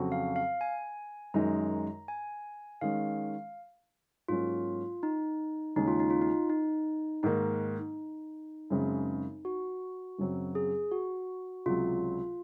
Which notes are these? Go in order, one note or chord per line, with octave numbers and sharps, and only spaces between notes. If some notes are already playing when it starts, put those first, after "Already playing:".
Already playing: F2 C#3 F#3 C4 F#4
F5
F5
G#5
F#2 D#3 G#3 D#4 A#5
G#5
D#3 G#3 C#4 F5
G#2 F#3 A#3 C#4 F4
D#4
D#2 C#3 G#3 C#4 D#4
F4
D#4
F4
D#4
D#4
G#2 D#3 A#3 D#4
F#2 C#3 G#3 C4
F#4
F#2 C#3 F#3 C4
G#4
F#4
C#2 C3 F#3 F4